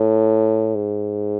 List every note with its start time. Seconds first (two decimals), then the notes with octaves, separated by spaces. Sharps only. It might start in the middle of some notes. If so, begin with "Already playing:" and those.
Already playing: A2
0.75 G#2